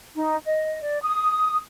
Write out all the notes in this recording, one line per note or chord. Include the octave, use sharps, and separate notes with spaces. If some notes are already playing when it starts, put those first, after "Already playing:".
D#4
D#5
D5
D#6